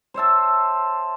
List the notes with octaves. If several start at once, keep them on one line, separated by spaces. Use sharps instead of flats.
C5 C#5 E5 A5